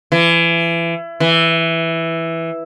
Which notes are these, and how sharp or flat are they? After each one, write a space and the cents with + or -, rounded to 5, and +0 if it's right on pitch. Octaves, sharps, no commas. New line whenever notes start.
E3 +30
E3 +0